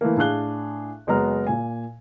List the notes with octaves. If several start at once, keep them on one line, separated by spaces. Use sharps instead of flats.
E3 A3 A#3
A2 D4 G#4 F5 F#6 G7
F#1 G#3 B3 F#4 A#5 F6
A#2 G#5